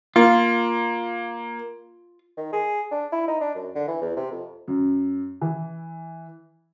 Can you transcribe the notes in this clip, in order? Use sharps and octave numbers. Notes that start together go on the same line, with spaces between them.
A#3 F4
D#3
G#4
D4
E4
D#4
D4
F#2
D3
E3
E2
C3
F2
F#2
E3